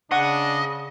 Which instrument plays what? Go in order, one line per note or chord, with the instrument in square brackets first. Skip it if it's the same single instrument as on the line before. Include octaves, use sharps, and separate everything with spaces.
[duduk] C#3 [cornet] D4 [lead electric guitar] D#5 [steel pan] F#5 C#6 D#6